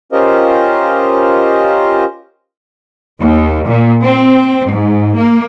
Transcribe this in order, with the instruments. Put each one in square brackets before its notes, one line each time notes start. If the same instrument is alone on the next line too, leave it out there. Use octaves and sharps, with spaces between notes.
[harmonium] C#4 F4 G4 A#4 C5 D#5
[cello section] D#2
A#2
C4
G#2
A#3